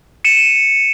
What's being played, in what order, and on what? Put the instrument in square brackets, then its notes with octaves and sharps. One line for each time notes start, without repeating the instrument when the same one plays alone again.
[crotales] C#7 D#7 E7